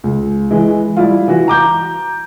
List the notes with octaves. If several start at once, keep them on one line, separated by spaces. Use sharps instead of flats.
C#2
E3 G#3
G3 E4 F4
E3 F#4
A#5 D6 G6